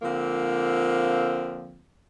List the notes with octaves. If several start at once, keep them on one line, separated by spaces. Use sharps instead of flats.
D3 F3 A#3 C4 F4